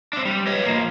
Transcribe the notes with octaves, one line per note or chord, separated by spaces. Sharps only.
C4 D4
G3
B4 C#5 D#5
F3 A#3